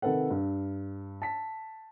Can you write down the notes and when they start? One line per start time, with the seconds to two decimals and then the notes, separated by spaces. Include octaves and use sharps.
0.02 C3 D#3 A4 B4 F#5
0.30 G2
1.22 A5 B6